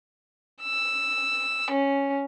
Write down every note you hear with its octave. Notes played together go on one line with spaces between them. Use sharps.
E6
C#4